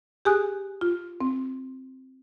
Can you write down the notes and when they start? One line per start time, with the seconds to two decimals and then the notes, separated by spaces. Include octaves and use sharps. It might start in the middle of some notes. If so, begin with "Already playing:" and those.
0.25 G4 G#4 G#5 D#6 F#6
0.81 F4
1.21 C4